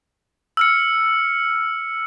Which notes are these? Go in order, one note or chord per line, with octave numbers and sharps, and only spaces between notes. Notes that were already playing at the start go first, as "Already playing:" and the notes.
E6 F6 C#7